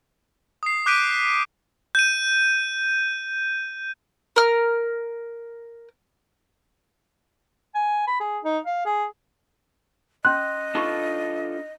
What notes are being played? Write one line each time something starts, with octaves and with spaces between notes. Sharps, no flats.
D#6 C7
D6 F#6 G6 B6 D7 D#7
G6 D#7
A#4 F6
G#5
B5
G#4
D#4
F5
G#4
C#4 D#5 C6 F#6
D4 D#4 F4 A4 B5 C#6